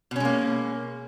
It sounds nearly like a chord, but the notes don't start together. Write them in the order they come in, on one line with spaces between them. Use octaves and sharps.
B2 C#4 G#3 A#3